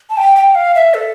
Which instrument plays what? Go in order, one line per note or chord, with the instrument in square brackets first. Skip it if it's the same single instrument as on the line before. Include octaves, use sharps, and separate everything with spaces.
[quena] A5
G5
G5
F5
E5
A4